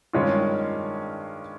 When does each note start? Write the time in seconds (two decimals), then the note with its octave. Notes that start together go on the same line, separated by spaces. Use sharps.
0.13 G2 D#3 G#3 C#4 F4